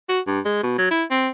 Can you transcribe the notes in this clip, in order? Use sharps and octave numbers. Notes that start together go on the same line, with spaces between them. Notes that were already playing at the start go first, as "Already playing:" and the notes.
F#4
G2
G#3
B2
F#3
E4
C4